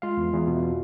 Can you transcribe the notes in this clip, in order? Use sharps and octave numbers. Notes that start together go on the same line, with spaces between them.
G#3 F4 F5
E2
E2
B2
B2